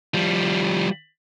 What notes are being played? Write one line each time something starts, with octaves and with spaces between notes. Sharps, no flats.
F3 G3